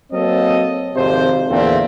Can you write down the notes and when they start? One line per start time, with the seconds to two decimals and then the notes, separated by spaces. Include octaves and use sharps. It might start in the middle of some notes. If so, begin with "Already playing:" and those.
0.12 F#3 A#3 C4 A4 D#5
0.95 G#1 F2 C3 C5
1.49 E2 A#2 D3 A3 C4